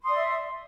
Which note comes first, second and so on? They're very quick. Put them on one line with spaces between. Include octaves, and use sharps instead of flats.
C6 D#6 D5 E5